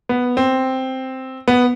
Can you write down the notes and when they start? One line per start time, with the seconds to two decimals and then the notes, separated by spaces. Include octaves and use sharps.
0.09 B3
0.37 C4
1.48 B3